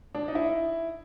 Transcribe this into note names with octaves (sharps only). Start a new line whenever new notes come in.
D4
D#4
E4